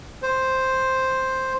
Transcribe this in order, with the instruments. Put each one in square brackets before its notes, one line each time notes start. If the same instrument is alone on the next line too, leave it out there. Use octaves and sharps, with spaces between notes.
[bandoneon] C5